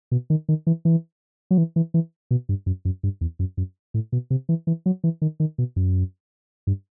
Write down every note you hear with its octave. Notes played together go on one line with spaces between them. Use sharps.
B2
D#3
D#3
E3
E3
F#3
E3
E3
E3
B2
G2
F#2
F#2
G2
E2
F#2
F#2
A2
B2
C3
E3
E3
F#3
E3
D#3
D#3
B2
F#2
G2